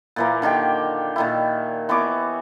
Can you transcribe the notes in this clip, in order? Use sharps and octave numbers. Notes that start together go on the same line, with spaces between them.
A#2 E3 A#3
D3 D#3 G4 G5
A#2 D#3 E4
E3 B3 C#5 D6